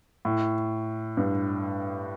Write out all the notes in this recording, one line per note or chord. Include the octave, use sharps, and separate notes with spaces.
A2
G2